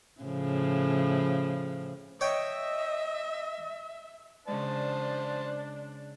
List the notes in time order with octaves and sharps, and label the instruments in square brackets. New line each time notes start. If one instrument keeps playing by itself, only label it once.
[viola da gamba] A2 C#3 F3
[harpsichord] C#5 G5 [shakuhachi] D#5 [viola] E5
[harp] C#3 G#3 [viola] D4 [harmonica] C5 A5 [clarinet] D5